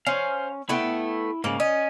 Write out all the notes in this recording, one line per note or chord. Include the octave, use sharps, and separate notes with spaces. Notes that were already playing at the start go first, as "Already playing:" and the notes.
C#4 C5 F5
A3 B3 E4 G5
G#2 C#3 A#3
C#4 D#5